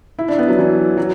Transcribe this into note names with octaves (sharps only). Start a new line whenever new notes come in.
E4
D4
B3
F#3
E3
F#3